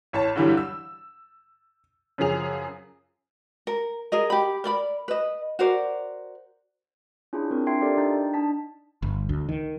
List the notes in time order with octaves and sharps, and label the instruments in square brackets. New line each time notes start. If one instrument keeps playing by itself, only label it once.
[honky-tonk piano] A1 C#5 A5
G2 D3 E3 F#3 G3
E6
F#2 C#3 F3 G#4 F7
[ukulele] A#4
G#4 A#4 D#5
G4 B5
A#4 D5 B5
B4 D#5
F#4 A#4 C5 D5
[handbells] C#4 D4 E4 F4 G#4
C4 D4 F4 A#4
D4 E5 G5 C6 G#6 C7
F4 G4 A4 A#4 D5 E5
D4 D#4 G5 A#5 G6 A6
D4 D#4 A5 B6
[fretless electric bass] G1
D2
D#3